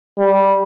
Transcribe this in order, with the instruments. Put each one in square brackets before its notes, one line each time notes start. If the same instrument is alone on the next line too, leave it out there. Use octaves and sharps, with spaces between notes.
[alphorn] G3